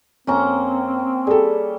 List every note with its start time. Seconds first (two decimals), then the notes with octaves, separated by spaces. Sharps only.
0.27 F2 A#3 C4 C#4 A#5
1.27 G3 G#4 A4